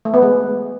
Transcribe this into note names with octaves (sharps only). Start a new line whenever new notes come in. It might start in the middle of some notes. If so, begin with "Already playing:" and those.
A3
B3
G#3